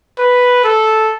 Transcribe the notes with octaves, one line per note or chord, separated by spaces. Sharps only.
B4
A4